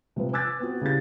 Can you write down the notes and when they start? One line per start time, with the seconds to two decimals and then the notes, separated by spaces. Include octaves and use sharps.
0.16 C3 F3 B4
0.33 G#5 D6 E6 F#6 G#6 A6
0.59 B3 C4 F#4
0.81 C#3 E4 G4 A6